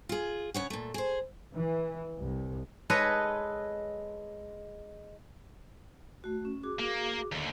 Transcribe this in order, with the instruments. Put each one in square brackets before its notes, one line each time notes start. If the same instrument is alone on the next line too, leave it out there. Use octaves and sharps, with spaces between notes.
[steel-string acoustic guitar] F4 G#4
C#3 C#5 F#5
A#2 A3
G#4 C5
[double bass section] E3
C2
[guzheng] G#3 A4 B4 C#5 D#5
[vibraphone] A3 F#4
C#4
F#4 G#4 D6
[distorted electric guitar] A#3
D#2 D3